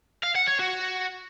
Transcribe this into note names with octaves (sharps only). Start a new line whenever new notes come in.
F5
F#5
C#5
F#4